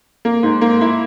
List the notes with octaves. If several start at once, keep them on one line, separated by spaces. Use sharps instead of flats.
A#3
G#2
A#3
E4